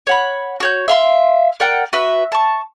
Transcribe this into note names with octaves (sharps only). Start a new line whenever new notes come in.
C#5 F#5 B5
F#4 C#5 G6
E5 F5 C6
A#4 D5 F#5 G5
F#4 B4 E5
A5 C#6